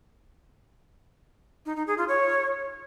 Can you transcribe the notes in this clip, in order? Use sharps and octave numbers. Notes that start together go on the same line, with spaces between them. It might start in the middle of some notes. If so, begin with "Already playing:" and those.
D#4
D#4
G#4
F4
C#5